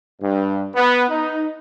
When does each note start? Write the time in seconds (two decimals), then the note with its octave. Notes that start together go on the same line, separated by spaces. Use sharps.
0.21 G2
0.75 B3
1.09 D#4